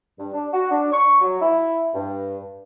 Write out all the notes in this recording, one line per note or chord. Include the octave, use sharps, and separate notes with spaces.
G2
D4
F#4
D4
C#6
F#3
E4
G2